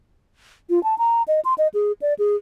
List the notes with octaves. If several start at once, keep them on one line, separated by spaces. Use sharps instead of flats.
F4
A5
A#5
D#5
C6
D#5
G#4
D5
G#4